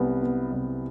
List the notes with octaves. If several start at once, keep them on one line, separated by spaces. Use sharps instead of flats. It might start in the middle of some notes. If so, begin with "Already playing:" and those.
Already playing: C2 B3
B3
C2